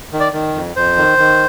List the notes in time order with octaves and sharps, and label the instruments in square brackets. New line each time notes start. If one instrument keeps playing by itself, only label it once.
[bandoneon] D#3
D5
D#3
F2
F2 C5
D#3
D#3